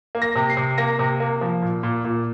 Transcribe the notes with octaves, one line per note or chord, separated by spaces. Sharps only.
A#3
A#6
C3
C7
C3
A#3 A#6
C3
A#3
F3
A#2
A#2
A#2